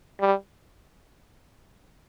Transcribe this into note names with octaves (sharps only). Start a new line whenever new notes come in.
G3